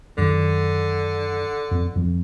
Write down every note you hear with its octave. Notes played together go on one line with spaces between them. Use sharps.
F#2 D3 D#3
F2 C4
F2 F3 C4